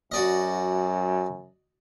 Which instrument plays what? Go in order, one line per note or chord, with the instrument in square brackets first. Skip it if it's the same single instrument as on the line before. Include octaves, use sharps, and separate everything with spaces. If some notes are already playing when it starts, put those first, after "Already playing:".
[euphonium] F#2 [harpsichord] F#4 D5 D#5